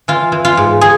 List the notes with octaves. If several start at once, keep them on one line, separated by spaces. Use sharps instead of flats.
E3 F4
E3
F4
G#2
G#4